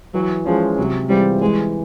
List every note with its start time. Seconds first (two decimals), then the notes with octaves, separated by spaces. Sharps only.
0.14 E3 F#3
0.45 F3 G#3 C#4
0.78 C3 F#3
1.09 E3 G3 G#3 C4 F4
1.41 E3 G#3